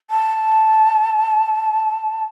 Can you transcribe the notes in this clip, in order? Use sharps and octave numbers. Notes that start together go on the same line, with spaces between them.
A5